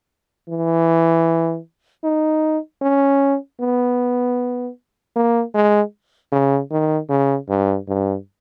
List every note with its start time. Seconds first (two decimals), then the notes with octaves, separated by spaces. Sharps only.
0.49 E3
2.04 D#4
2.82 C#4
3.60 B3
5.16 A#3
5.54 G#3
6.32 C#3
6.71 D#3
7.09 C#3
7.49 G2
7.88 G2